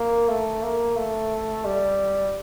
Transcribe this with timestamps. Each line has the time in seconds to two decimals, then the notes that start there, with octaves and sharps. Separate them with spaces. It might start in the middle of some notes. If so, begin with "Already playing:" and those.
Already playing: A#3
0.28 A3
0.62 A#3
0.96 A3
1.65 G3